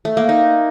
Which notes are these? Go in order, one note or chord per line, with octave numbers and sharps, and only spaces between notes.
A3
A#3
D#4